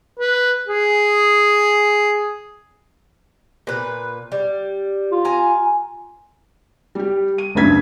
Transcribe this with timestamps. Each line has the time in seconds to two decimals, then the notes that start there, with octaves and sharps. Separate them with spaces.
0.20 B4
0.68 G#4
3.67 A#2 B4
4.32 G3
5.12 F4
5.25 G#5 A#5
6.95 G3 G4
7.38 D#7
7.55 F#1 D2 G2 C#3 G#6 B6